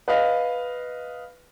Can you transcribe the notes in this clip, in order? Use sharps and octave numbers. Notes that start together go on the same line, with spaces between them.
B4 D#5 F5